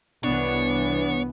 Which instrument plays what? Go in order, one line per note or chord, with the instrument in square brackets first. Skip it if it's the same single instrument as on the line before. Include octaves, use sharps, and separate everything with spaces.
[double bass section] C2 E3 [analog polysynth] B3 [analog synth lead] D4 [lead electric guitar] C#5